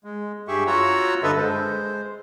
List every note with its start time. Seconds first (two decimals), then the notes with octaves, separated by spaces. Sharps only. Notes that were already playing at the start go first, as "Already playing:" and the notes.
0.04 G#3
0.48 G2 G4 G#4 E5 C#6
0.67 F4 F#4 C#5 F#5 A#5 E6
1.23 G2 D3 A4 B4 D#5 E5
1.37 G#3 C5